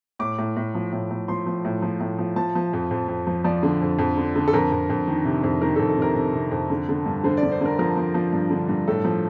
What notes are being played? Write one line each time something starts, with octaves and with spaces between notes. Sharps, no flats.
A2 D6
A2
A2
F3
A2
A2
F3 C6
F3
A2
F3
A2
F3
F3 A5
F3
F2
F2
F2
F3
F3 D5
D3
F2
F2
D3
D3
A4
F2 A#4
F2
F2
D#3
C3
F2
D#3 A#4
F2 A4
A4
C3 A#4
C3
C3
F2
D3
D3
G2
D3 C5
D5
D3
C5
D3 A#4
F3 A#4
F3
F3
G2
D3
G2
A2 A4
F3